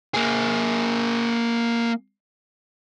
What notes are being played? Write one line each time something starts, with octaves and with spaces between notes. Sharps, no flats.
A#3 G#4